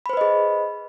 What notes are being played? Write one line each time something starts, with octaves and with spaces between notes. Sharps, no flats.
G#4 B4 C5 D#5 B5